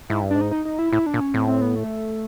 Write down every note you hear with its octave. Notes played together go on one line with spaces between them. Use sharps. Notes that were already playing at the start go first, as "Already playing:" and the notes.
G#2 E4
G2
D4
G#2
D#4
D#4
D#4
E4
A2 E4
D4
A#2
C#4
A2 C4
C4
B3
A3